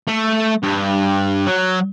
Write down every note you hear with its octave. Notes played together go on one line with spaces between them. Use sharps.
A3
G2
F#3